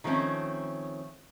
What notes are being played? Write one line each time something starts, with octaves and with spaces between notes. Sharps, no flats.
D#3 F3 A3 C4 C#4